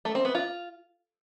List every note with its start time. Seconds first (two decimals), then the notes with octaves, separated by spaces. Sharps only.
0.05 A3
0.15 C4
0.25 B3
0.35 F4